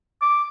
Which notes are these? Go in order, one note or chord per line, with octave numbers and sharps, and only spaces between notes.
D6